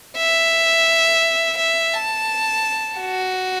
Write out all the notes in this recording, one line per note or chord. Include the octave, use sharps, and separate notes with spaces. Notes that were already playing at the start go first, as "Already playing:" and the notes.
E5
E5
A5
F#4